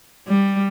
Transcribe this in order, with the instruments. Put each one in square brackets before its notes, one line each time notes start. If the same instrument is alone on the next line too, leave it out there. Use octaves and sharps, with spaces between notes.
[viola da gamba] G3